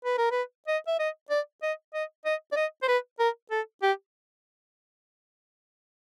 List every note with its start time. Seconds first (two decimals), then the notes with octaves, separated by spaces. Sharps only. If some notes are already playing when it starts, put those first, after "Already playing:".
0.05 B4
0.18 A#4
0.31 B4
0.68 D#5
0.87 E5
0.99 D#5
1.31 D5
1.62 D#5
1.94 D#5
2.25 D#5
2.52 D5
2.56 D#5
2.83 C5
2.88 B4
3.19 A#4
3.51 A4
3.82 G4